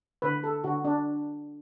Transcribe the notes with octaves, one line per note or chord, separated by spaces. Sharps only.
D3 B4
A4
D3 F#4
D4